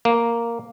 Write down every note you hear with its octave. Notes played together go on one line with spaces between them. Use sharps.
A#3